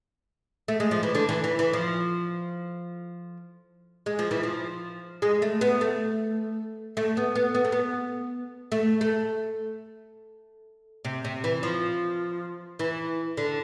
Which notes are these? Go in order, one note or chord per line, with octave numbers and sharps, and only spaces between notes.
A3
G#3
F3
E3
D3
E3
E3
E3
F3
G#3
F3
E3
F3
G#3
A3
B3
A3
A3
B3
B3
B3
A3
B3
A3
A3
C3
C3
E3
F3
E3
D3